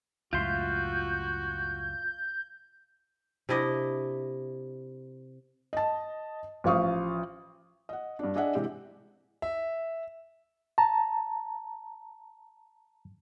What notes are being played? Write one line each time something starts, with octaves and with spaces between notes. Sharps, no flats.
C#2 F#2 A2 F4 F#4 E5 C6 G6
C3 D4 E4 D#5
D#5 A5
A1 F3 C5 F5 C#6 D#6
D#5 F#5
G2 D4
D4 G#4 D#5 E5 F#5
C3 E3 G#3 C4 G4
E5
A5 A#5